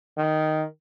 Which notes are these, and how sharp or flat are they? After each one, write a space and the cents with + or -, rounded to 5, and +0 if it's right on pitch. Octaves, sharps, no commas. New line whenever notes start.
D#3 +0